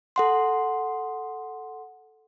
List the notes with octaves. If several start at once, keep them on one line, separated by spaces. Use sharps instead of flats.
A4 F#5 C6